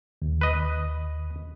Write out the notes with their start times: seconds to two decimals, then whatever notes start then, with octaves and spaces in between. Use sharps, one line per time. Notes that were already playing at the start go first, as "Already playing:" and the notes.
0.22 D#2
0.41 B4 D#5